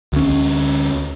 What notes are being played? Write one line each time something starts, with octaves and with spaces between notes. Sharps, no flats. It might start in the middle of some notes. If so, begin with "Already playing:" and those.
D2 C#4